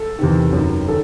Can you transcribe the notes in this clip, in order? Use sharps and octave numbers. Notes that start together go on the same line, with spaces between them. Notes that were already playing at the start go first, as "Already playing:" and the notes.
Already playing: A4
E2 C3 D#3
F#2
D#3
D#3 A4